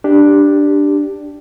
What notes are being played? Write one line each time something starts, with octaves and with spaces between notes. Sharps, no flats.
D4 G4